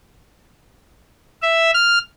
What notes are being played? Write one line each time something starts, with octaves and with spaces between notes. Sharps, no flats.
E5
F6